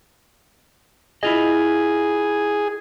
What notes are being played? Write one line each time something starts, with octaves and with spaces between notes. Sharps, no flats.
E4 F4 G#4 D#5